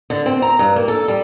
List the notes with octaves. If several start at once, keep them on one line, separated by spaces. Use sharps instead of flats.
D3
C4
A#5
G2
A#3
A4
G3